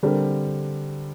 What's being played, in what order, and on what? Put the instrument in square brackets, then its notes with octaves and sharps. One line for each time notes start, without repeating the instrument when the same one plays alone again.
[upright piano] D3 G3 C4 G4 A#4